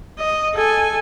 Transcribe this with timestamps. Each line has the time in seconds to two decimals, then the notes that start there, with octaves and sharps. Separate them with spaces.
0.19 D#5
0.54 A4 G#5